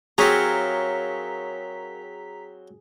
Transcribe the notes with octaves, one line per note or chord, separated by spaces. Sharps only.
F#3 C4 G#4 A#4 C#5 F5 A#5 B6